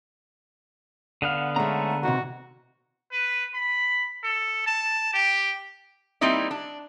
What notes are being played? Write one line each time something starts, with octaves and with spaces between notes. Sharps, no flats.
D3 B3 F5
G#3 A3 C#4 A#5
C3 D#3 E3 F#4
B4
B5
A4
A5
G4
G3 A#3 C4 D#4 E4 D5
D4